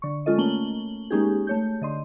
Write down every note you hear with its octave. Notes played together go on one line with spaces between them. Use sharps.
D3 C#6
G#3 C#4 F4 A4 D#5
A3 A#3 C#4 F#7 G7
G#3 A#3 C#4 D#4 G4 G#4
A3 C#5 G6
D3 D#5 C6